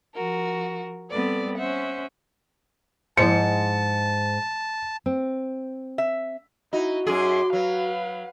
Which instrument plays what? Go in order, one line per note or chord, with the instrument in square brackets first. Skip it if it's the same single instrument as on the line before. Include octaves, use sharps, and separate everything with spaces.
[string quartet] F3 F#4 A#4
G3 B3 C4 A4 B4 D5
C#4 C5 E5 F#5
[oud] G#2 [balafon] F3 E4 C5 [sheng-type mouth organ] A5 [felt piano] C#7
[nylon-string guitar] C4
[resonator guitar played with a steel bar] E5
[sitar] D#4 [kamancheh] E4 [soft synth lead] F#4
[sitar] F#2 G#4 [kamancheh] C6 D6
[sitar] F#3 [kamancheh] B4 F5